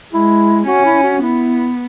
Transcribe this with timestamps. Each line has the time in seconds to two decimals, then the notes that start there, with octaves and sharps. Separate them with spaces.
0.13 G#3 E4
0.67 C#4 F#4
0.85 E4
1.03 F#4
1.21 B3 E4